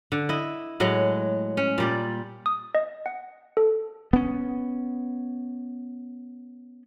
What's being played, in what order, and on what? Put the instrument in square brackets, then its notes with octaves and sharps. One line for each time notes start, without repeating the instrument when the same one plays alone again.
[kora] D3
E4 D#5
A2 F#3 G#3
C#4
A#2 G3 D5
[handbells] D#6
D#5
F#5
A4
[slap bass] B3 C#4